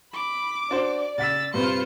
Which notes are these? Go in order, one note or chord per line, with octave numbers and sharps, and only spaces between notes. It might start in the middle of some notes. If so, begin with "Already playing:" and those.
B5 D6
D4 F#4 C5 D5
C#3 F#5 E6 A6 B6
G2 C3 F4 B4 C5 C#7